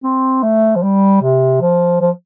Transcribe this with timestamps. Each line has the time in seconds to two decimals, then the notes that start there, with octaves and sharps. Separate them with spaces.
0.04 C4
0.43 A3
0.76 F3
0.83 G3
1.22 C3
1.61 F3
2.01 F3